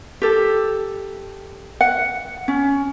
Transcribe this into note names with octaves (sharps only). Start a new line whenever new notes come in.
G4 A4
F#5
C#4